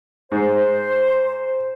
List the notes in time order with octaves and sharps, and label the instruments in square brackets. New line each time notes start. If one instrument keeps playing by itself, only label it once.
[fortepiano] G#2 [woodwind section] C5